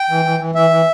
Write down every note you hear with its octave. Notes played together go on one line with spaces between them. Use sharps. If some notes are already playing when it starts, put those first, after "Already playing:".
Already playing: G5
E3
E3
E3
E3 E5
E3